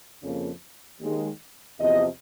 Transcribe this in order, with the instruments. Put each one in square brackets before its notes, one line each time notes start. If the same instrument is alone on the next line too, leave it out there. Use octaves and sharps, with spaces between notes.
[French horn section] F2 C#3 F3 A#3
D#2 D#3 G#3
E2 C3 F3 D#5